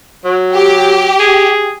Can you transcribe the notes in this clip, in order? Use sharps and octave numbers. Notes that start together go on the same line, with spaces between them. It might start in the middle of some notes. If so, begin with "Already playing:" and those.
F#3
G4
G#4